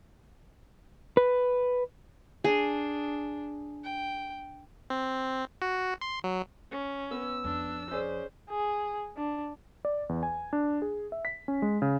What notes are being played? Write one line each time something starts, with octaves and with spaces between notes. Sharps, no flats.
B4
D4 G#4
G5
C4
F#4
C6
F#3
C#4
B3 E6
F2 D4
C#4 G#4 C5 D5
G#4
D4
D5
E2
G#5
D4
G#4
E5
B6
C#4
G#3
C#3